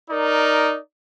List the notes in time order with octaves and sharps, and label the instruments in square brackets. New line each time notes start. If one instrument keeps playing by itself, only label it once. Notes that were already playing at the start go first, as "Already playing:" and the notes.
[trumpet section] D#4 A#4 D5